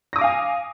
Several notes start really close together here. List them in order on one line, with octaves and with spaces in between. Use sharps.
A#6 D#6 D6 F5 G#5